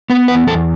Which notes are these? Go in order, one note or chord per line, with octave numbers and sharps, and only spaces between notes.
B3 B4
E2 B4
E2 A4